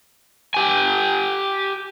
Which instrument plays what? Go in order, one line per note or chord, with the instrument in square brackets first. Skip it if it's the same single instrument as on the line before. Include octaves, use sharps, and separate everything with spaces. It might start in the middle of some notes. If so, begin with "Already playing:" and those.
[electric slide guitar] G4 G#5